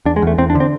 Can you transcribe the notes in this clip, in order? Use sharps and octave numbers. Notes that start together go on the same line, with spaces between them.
E2 D4
G#3
E2 A3
E2 C4
D4
D3
C4